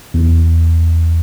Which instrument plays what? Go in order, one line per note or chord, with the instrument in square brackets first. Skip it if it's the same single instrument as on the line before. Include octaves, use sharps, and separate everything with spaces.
[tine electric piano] E2